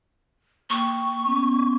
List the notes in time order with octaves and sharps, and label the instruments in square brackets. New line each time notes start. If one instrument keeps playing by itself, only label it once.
[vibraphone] A#3 G5 [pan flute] C#6
[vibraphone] B3 C#4